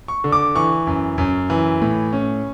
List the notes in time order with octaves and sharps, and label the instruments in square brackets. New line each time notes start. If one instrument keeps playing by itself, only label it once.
[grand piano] C#6
D3
D6
E3 C#6
F#2
F#2
E3
A2
C#4